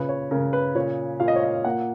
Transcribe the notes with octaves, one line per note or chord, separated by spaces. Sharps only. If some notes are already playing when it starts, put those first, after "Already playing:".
Already playing: A#2 C#3 B4
C#5
C#3 A#4
B4
A#2 C#5
A#2 F5
D#5
C#5
D#5
A#3 F#5